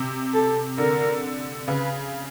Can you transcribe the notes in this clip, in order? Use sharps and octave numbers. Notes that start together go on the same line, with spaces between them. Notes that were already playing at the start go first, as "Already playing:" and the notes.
Already playing: C3
A4
D3 A#4
C#3 B4